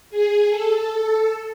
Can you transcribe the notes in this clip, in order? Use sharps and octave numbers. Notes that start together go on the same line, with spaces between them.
G#4
A4